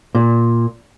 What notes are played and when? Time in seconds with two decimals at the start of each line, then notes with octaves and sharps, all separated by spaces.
0.15 A#2